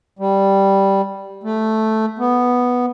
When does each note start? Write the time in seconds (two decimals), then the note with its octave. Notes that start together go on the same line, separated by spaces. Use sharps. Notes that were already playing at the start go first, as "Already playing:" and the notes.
0.19 G3
1.43 A3
2.19 B3